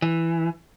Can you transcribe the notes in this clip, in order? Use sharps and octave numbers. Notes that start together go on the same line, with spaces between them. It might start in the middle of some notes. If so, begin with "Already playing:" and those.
E3